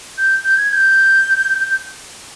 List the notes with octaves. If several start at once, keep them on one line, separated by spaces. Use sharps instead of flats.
G6
G6
G#6
G#6
G6